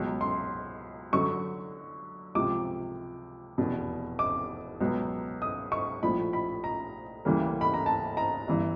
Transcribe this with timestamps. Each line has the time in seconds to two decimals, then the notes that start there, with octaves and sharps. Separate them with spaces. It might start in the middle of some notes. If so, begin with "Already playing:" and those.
Already playing: C#2 B2 F#3
0.21 C6
1.13 F#2 D3 F#3 C#6
2.35 C#2 C3 F3 D6
3.58 F1 E2 B2
4.19 D6
4.81 C#2 B2 F#3 B3
5.42 D#6
5.72 C#6
6.03 A#1 A2 F3 B5
6.33 B5
6.64 A#5
7.25 D2 C#3 E3 G3 A#3
7.61 B5
7.74 A#5
7.86 A5
8.17 A#5
8.47 G1 G2 E3